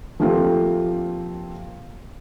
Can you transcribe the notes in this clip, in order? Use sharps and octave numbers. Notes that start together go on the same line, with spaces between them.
F3 A3 A#3 C4 F4 G4